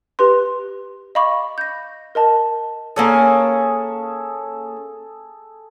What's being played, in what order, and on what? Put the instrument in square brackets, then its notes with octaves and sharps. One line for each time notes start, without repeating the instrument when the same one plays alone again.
[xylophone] G4 B4 C6
D#5 F5 B5 C#6 D6
G6 A#6
A#4 D#5 A5
[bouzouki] A#3 C#4 C#5 [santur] G#4 A4